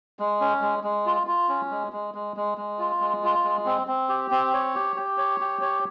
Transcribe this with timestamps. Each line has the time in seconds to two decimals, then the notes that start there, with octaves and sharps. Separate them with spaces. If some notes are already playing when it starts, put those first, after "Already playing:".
0.19 G#3
0.41 C#4
0.62 G#3
0.84 G#3
1.06 F4
1.27 F4
1.49 C#4
1.71 G#3
1.92 G#3
2.14 G#3
2.37 G#3
2.58 G#3
2.79 F4
3.01 G#3
3.23 F4
3.44 G#3
3.66 C4
3.87 C4
4.09 G4
4.31 C4
4.54 C#5
4.75 G4
4.96 G4
5.18 C#5
5.40 G4
5.62 C#5